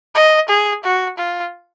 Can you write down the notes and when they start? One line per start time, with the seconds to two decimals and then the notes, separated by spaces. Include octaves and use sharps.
0.15 D#5
0.49 G#4
0.84 F#4
1.18 F4